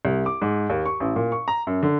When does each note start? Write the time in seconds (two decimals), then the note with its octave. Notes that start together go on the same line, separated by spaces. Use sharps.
0.05 C2
0.26 D6
0.42 G#2
0.70 D#2
0.86 C#6
1.00 A1
1.16 A#2
1.32 C#6
1.48 A#5
1.67 F#2
1.83 D3